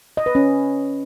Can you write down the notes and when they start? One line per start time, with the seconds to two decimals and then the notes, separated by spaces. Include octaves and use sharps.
0.17 D#5
0.26 B4
0.35 C#4